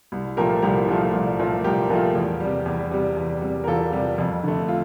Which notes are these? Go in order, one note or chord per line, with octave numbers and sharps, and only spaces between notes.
C2
A#2 F3 A3 G4 A#4
C2 G4 A#4
A#2 F3 A3
C2
A#2 F3 A3
C2 G4 A#4
A#2 F3 A3
E2
C3 G3
E2
C3 G3
E2
C3 G3
A#4
E2 F4 A4
C3 G3
F2
D3 A3
F4